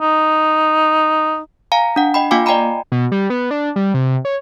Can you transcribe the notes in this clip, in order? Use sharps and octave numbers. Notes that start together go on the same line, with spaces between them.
D#4
F5 G#5 A#5
D4 F#5
D#5 G5 B5
A#3 F4 F5 G5 G#5 D6
D5 D#5 G5 G#5 A#5 B5
B2
G3
B3
D4
G3
C3
C#5